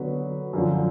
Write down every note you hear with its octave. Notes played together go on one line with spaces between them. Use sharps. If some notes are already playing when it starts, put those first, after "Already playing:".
Already playing: D3 F#3 B3 F#4 B4
F#2 D3 F3